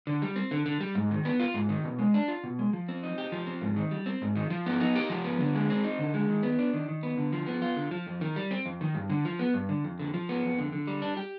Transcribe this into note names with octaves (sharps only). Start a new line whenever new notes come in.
D3
G3
C4
D3
D3
G3
G#2
D#3
B3
F4
G#2
D#3
B2
G#3
D4
F4
B2
G#3
F3
C4
D#4
G4
F3
C4
G#2
D#3
G3
C4
G#2
D#3
F3
B3
D#4
G4
F3
B3
D3
G#3
C4
D#4
D3
G#3
D#3
B3
D4
D#3
D#3
B3
D3
F3
B3
F4
D3
F3
F2
D#3
G3
C4
F2
D#3
G2
D3
F3
B3
G2
D3
F2
D3
F3
B3
F2
D3
D3
G3
D4
G4